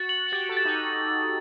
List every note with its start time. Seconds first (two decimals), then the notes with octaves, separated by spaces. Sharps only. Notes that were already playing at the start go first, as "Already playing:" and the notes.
Already playing: F#4 A6
0.09 F#7
0.26 F#4
0.32 G4 A6
0.49 A4
0.57 A6
0.65 D#4